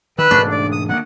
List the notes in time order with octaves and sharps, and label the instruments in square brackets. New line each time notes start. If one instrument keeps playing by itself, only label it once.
[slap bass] D#3 [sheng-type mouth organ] B4 E6 F#6
[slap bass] E1 G#2 C#3 [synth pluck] A3 D4
[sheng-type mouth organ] D5
D#6
[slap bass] D2 G#3 A#3 [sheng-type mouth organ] F#5